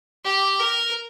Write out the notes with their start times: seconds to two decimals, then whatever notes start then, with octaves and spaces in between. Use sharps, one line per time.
0.25 G4
0.60 A#4